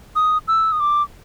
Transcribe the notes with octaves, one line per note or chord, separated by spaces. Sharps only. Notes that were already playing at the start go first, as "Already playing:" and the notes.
D#6
E6
D#6
D6